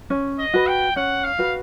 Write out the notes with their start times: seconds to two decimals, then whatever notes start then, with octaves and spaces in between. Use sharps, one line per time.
0.10 C#4
0.39 D#5
0.54 F#4 B4
0.67 G5
0.96 C#4 F#5
1.24 F5
1.39 F#4 B4